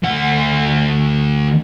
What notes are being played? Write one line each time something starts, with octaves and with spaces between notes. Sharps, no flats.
D2 F#5